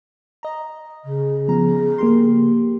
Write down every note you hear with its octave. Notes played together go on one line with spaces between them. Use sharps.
D#5 A#5
C#3
F3 B3 A#5
A#3 G4 C6